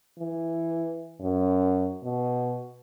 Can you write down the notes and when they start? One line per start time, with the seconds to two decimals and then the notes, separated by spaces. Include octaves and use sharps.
0.19 E3
1.21 F#2
2.03 B2